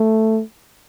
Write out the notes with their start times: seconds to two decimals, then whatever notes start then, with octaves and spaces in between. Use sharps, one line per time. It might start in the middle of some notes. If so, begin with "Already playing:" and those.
Already playing: A3